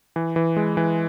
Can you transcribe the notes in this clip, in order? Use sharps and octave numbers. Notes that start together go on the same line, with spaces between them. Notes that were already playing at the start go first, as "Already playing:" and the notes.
E3
E3
G#3
E3